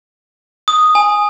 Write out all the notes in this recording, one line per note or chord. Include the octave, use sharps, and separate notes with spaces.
D#6
G#5